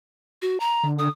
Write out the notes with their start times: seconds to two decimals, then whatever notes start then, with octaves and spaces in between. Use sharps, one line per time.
0.42 F#4
0.60 A#5
0.83 D3
0.99 D3 D#6